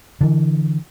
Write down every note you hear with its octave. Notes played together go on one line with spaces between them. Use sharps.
D3 E3